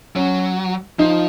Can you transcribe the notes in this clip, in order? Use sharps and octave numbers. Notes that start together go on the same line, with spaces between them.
F#3 C#4
F3 D#4